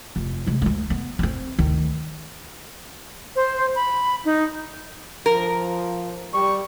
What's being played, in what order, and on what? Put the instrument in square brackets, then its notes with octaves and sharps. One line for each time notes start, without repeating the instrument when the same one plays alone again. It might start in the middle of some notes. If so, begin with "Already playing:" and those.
[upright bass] F1
C3 G#3
D2 G#3
B3
C4 C#4
D2 D#3
[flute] C5
B5
D#4
[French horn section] F3 [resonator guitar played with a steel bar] A#4
[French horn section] G3 [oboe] C#6